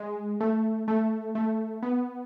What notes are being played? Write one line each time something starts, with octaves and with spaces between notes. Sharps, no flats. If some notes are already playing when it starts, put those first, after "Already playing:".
Already playing: G#3
A3
A3
A3
B3